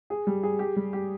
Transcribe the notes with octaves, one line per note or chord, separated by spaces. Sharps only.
G#4
G3
G#4
G4
G3
G4